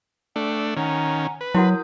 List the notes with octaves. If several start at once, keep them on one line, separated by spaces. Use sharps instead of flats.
A3 D4 G5
D#3 C#4 F#5 G#5 A#5
B4
F#3 E4 F#4 A#4 F#5 D#6 G6